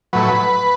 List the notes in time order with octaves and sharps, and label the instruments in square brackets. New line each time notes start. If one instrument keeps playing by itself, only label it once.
[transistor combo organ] A2 F#3 B4